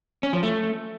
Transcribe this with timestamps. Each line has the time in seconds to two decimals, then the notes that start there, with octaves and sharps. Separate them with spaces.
0.23 C#4
0.33 F3
0.43 A3